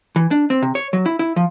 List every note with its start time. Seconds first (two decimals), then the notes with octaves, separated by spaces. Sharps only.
0.16 E3
0.31 D4
0.50 C4
0.62 C3
0.75 C#5
0.93 F#3
1.06 E4
1.19 E4
1.36 F3